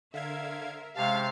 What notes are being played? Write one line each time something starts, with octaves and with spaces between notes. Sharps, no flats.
D3 A#4 C5 E5 F5 G#6
C3 G#3 C#4 F5 A5 C#6